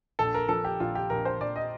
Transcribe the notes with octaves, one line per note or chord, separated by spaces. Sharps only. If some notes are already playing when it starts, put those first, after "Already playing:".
A#1 A4
A#4
F3 A4
G4
A#1 F4
G4
A#1 A#4
C5
A#1 D5
D#5